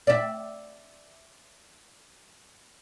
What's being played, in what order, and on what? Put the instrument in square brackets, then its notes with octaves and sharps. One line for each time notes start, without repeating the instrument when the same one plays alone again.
[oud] D5 E5